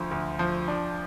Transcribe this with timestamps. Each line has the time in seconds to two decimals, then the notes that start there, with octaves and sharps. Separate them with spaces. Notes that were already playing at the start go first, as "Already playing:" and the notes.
Already playing: D2 D3 F3
0.11 D2
0.39 F3
0.68 D4